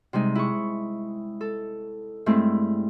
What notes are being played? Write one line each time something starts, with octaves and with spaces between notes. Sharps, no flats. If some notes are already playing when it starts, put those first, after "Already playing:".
C3 G3 G#3 D#4
E4 G#4 C#6
A4
G2 G#3 A3 C4 E4